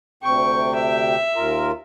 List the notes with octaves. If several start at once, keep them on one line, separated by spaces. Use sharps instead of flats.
D2 C3 G5 C#6
E5
D#2 F4 A#4